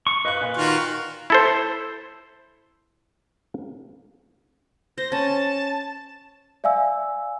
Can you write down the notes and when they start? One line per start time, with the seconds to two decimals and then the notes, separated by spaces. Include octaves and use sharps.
0.07 C#6
0.25 B4 D#5 F5 F#6
0.41 A#2
0.57 D#3 F4 F#4
1.30 E4 A4 C5
4.98 C5 A#6
5.12 C#4 A5
6.64 D5 E5 F5 G#5 E6